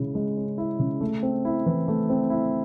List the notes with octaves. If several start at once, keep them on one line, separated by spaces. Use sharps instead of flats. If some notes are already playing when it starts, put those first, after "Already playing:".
Already playing: C#3 G#3 C#4 E4
G#3
C#4
E4
C#3
A3
C4
E4
E3
A3
C4
E4